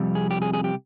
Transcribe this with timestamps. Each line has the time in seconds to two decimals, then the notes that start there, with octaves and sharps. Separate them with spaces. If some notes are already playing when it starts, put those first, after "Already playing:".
Already playing: F2 C3 G3
0.15 G#4
0.31 G4
0.42 G#4
0.53 G#4
0.64 G4